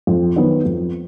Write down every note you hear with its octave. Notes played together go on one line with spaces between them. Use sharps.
F2
D#3 F#3 B3
F2